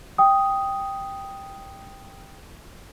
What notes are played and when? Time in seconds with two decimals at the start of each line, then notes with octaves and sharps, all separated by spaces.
0.18 G5 D#6